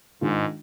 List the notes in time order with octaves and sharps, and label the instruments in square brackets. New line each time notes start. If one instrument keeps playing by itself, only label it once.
[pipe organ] G#2 [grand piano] D#3 G#3 D4 F4